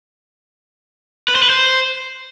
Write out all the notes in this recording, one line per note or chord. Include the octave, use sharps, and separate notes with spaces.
B4
C5
B4
C5